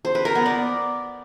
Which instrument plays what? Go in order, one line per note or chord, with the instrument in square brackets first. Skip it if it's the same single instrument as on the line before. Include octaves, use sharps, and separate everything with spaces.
[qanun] C5
B4
A#4
B3
D5